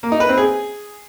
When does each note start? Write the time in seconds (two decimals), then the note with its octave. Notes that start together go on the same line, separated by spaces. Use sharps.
0.03 A#3
0.12 D#4
0.20 B4
0.29 C4
0.38 G#4